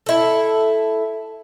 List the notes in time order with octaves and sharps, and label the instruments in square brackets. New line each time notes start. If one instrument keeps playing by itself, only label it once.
[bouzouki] E4 A4